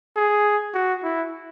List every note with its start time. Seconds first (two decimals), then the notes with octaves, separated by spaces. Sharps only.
0.16 G#4
0.74 F#4
1.03 E4